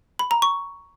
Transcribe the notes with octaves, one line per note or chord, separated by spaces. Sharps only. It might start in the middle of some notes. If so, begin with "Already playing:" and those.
B5
A#5
C#6